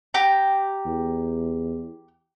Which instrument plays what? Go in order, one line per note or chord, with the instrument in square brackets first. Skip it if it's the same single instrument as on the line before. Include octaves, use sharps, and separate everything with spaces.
[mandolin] G4 A#5
[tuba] E2